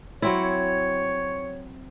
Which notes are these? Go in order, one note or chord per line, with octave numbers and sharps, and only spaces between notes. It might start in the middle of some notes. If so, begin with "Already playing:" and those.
F#3 C4 E4 C#5